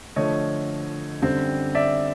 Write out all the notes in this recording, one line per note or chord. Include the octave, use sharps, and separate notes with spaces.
D3 F3 A3 C#5 D#5
F#2 D3 G3 C4
D5 E5